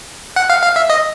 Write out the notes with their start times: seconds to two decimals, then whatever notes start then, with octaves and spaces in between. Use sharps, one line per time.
0.36 F#5
0.50 F5
0.63 F5
0.76 E5
0.90 D#5